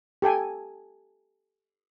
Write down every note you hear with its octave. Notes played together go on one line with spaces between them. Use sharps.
G4 A4 G5 G#5